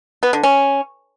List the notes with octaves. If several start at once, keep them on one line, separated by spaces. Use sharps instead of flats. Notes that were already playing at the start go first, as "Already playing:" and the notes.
B3
D3
C#4